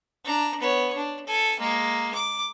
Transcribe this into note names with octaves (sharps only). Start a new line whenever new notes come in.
D4 A#5
B3 C#5
D4
A4 G#5
G#3 A#3
D6